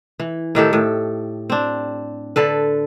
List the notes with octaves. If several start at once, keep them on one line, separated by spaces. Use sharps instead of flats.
E3
A2 D#3 G4 A4
A2
C4 D4
D3 A4 B4